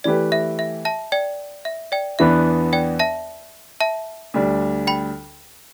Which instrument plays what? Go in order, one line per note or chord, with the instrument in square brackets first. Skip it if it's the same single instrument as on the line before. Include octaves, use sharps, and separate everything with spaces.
[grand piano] E3 A3 G4 B4 [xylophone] D5
[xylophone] E5
E5
E5 A5
D5 G5
E5
D5 G5
[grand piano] E2 E3 B3 D4 B4 [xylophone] E5
[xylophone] D5 G5
E5 A5
E5 A5
[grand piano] D2 D3 G3 D4
[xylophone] G5 B5